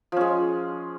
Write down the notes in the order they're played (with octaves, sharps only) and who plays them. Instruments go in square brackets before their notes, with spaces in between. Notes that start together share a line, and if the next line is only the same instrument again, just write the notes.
[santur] F3
C#4
G#3